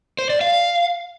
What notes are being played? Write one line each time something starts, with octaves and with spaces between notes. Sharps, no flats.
C5
D5
F5